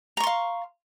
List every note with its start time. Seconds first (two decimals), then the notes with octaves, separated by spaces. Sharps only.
0.17 A#5
0.20 C#6
0.24 C6
0.27 F5